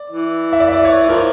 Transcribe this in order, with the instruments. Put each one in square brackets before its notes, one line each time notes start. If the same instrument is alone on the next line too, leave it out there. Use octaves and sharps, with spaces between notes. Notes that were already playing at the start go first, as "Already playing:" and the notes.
Already playing: [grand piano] D5
[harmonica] E3
[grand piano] E5
D5
E5
D5
C#5
[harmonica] F3 [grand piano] A#4